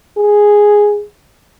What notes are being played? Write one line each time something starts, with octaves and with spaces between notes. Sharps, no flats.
G#4